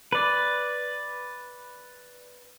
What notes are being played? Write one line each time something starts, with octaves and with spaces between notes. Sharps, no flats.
B4 D5